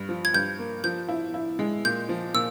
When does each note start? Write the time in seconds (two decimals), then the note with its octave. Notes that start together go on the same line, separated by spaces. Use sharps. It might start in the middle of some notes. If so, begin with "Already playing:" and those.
Already playing: G2
0.09 F3
0.25 G#6
0.34 G2 G6
0.59 A#3
0.84 F3 G6
1.09 E4
1.34 E4
1.59 G#3
1.85 A#2 G6
2.09 F3
2.34 A#2 E6